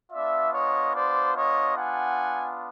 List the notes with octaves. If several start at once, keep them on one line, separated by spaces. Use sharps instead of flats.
B3 D4 F4 D5 E5
C#5 D#5
C5 D5
C#5 D#5
F#5 G#5